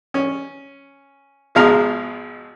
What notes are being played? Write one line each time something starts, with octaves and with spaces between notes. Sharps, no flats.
C#4
G#1 B2 F3 G#3 F5 A#5